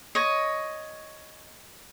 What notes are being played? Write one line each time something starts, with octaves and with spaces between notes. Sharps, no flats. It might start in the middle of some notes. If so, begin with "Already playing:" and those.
C#5 D#5